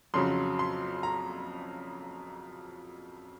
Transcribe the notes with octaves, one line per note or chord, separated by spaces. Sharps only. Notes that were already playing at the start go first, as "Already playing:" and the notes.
F2 C#3 F#3 C6
C6
A#5